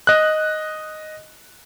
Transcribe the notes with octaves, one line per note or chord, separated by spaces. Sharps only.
D#5 F#6